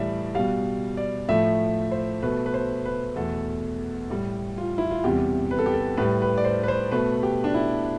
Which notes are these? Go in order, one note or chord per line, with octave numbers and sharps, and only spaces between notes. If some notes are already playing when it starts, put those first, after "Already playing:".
Already playing: A2 E3 G3 D5 E5
B2 G3 F5
D5
A2 F3 A3 E5
C5
B2 A3 B4
B4
C5
B4
E2 B2 A3 A4
A2 G3 G4
F4
E4
F4
E2 C3 G3 G4
B4
A4
G4
A4
A2 G3 B4
B4
D5
C5
B4
C5
B2 A3 B4
G4
D4
E4